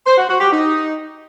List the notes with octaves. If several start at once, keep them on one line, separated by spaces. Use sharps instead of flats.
C5
F#4
F#4
G4
D#4